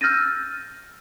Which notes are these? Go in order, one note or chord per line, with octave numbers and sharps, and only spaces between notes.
E6 F6 G6 A6 A#6 D#7